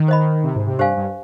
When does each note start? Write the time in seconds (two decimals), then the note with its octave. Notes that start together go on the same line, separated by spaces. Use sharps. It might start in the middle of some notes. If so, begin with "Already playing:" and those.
Already playing: D#3
0.08 C5 D#5 B5
0.44 C3
0.55 G#2
0.67 C3
0.78 G2 G4 C5 F5 G#5
0.97 G2